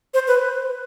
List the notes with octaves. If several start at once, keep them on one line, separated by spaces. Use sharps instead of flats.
C5
B4